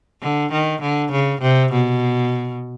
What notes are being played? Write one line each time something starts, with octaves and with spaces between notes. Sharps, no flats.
D3
D#3
D3
C#3
C3
B2